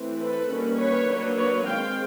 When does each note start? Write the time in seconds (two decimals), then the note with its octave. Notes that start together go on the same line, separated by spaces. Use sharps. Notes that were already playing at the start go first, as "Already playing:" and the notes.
Already playing: E3 A3 C4
0.19 A4 B4
0.48 D#3 G3 A#3 C#4
0.78 B4 C#5
1.08 F#3 A#3 D4
1.37 B4 C#5
1.67 D#3 G#3 C4 F5 G5